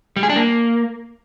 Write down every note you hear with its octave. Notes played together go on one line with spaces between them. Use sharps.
G3
G#4
D4
A#3